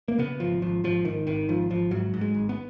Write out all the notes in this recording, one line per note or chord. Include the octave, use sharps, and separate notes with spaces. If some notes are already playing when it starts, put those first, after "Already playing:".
A#3
C#3 B3
G#1 F3
G#1 F3
G#1 F3
G#1 D#3
G#1 D#3
G#1 F3
G#1 F3
G#2 F#3
G#2
G#3
G#1
B3